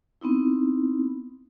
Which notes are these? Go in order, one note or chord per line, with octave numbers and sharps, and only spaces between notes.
B3 C4 D#4 E4